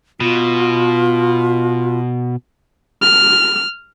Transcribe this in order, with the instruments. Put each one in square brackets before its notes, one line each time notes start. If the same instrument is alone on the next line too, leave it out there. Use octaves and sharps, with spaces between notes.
[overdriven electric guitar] B2 [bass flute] F4
[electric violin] F6